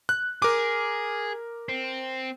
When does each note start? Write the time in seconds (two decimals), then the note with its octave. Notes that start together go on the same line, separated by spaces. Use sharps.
0.09 F#6
0.42 G#4 A#4 D6
1.69 C4